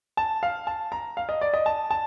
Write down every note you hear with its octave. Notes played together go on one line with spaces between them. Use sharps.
A5
F5
A5
A#5
F5
D#5
D5
D#5
A5
A5